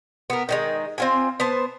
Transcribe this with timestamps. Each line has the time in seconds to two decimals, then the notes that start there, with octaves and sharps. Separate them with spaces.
0.30 B3 A#4
0.49 D#3 G3 G#3
0.98 C4 F4 G#5
1.40 B3 C5 A5